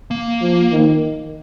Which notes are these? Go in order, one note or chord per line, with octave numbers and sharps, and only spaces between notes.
A#3
F3
D#3